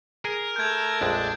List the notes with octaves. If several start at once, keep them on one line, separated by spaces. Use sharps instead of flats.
G#4 A#4
A3 E6 G6 G#6
A#1 F2 G#3 D4